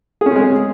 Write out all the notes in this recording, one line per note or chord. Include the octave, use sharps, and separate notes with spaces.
G#3 C4 C#4 G#4